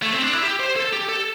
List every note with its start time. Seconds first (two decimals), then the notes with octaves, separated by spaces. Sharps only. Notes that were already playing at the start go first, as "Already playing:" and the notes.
0.02 A3
0.13 C4
0.22 D4
0.33 E4
0.43 G4
0.60 C5
0.76 A4
0.93 G4
1.09 A4